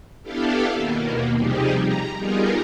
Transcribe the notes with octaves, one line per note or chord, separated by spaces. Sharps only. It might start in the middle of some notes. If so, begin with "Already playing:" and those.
B3 D4 E4 G4 A4 F5
D#2 B2 A#3
C3 F3 G3 D#4 G4 G#4
A#5
G3 B3 D#4 F4 G#4 A#4